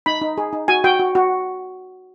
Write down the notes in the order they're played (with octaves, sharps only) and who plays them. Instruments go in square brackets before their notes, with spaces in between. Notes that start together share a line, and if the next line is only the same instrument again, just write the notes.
[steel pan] D#4 B5
D#4
G#4
D#4
F#4 G#5
F#4 G5
F#4
F#4